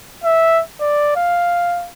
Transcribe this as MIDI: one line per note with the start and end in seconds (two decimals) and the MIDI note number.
0.24 0.61 76
0.81 1.13 74
1.16 1.89 77